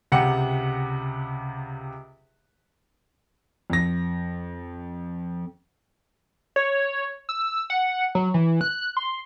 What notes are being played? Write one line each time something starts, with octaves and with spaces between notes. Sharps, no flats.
C#2 C3 G4 F#5 C#7
F2 A#6
C#5
E6
F#5
F#3
E3
F#6
C6